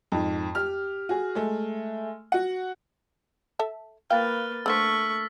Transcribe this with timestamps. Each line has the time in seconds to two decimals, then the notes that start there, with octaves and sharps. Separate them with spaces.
0.12 F2 G#2
0.55 G4 F6
1.09 F#4 G#4
1.35 G#3 A3
2.32 F#4 F#5
3.59 A4 E5 A5
4.10 A#3 F4 B4 F5 G5 F6 A6
4.66 D3 A3 E4 C5 C#6 E6 F6 B6